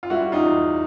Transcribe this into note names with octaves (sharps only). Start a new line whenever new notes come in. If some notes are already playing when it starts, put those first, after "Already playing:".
F4
G3 E4 F#4
D#4 F4
E2